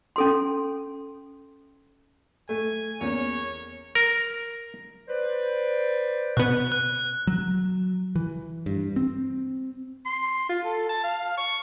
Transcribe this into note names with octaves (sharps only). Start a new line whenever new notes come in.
C#4 A4 C6
A3 G#5
E2 A#3 C#4 C#5
A#4
B4 C5 D5
B2 B3 F#6
F#6
F#3
E3
G2
C4
C6
F4
A4
A5
F5
C#6